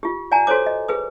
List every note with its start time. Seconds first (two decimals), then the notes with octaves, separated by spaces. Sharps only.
0.03 F4 G4
0.32 D5 F#5 G#5 A#5
0.47 F#4 A4 C5 C#5 D6
0.66 D#5
0.88 G#4 B4 D#6